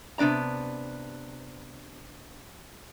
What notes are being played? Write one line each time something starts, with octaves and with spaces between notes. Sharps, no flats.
C3 B3 D4 D5 A#5